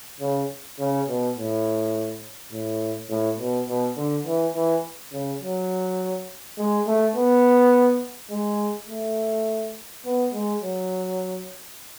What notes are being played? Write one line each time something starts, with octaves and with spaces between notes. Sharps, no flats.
C#3
C#3
B2
A2
A2
A2
B2
B2
D3
E3
E3
C#3
F#3
G#3
A3
B3
G#3
A3
B3
G#3
F#3